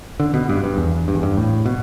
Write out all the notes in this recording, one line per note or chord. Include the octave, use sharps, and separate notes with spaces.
D3
B2
G2
G2
E2
G2
E2
G2
A2
B2